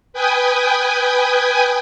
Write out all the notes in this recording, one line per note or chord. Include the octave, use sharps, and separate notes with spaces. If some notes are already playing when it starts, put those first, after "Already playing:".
B4 G5 G#5 D#6